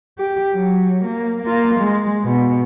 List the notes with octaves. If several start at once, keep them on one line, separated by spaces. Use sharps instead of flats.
G4
F#3
A#3
A#3 F4
G#3
B2